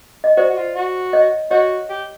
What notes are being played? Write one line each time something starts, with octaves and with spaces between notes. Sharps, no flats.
D#5
F#4 C5 D5
F#4
F4
F#4
C#5 D#5
F#4 C#5 D#5
G4